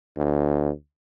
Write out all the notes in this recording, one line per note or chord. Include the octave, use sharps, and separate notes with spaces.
D2